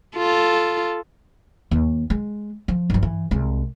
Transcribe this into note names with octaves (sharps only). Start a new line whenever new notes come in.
F4 A4
D#2
G#3
F3
G2 F3
E3
C2 G#3